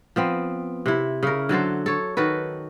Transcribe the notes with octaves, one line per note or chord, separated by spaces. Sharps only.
F3 B3 C4
C3 E4
C#3 E4 A#4
D3 F#3 A4 C5
A4 C#5
D#3 F#4 A4 B4